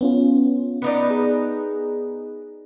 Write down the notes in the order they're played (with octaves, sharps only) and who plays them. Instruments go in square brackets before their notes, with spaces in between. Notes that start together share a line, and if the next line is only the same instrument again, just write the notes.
[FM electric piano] B3 C#4 F4
[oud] B3 D#4 D5 [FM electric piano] C#7
[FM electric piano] G#4